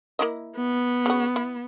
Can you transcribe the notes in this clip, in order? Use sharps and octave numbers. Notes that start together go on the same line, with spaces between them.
A#3 E4 D#5
B3
C#3 F#4
E4